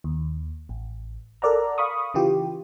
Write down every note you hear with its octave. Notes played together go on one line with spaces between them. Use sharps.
D#2
A1
A4 A#4 D5 F#5 A#5
F5 B5 C#6 D#6
C#3 E3 F4 G4